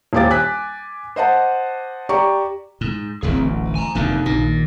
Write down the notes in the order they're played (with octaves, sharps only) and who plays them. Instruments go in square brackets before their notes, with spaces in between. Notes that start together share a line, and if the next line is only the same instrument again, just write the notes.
[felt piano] D#1 A#1 G4 F5 D6 A6
G#5 F#6 B6
C5 D#5 F#5 A5
G4 D5 A#5 C#6
[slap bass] G#2
[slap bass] D1 A1 [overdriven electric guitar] C4 G#4
[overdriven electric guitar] D2
G#5 A#5
[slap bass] F1 F2 D3 [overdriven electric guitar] A#3 D#4
[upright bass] A#1 D#3 [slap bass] A#2